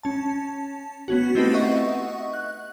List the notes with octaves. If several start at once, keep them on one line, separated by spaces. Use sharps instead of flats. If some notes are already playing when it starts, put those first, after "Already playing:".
C#4 A5
B3 C#4 F#4
A3 C4 D#4 E4 G4 B4
D#5 E5 F#5 C#6
F#6